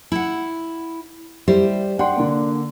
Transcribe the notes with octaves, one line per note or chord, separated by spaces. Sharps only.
E4 F#5
G3 E4 G4 C5
D4 F#5 G5 C6
D3 A#3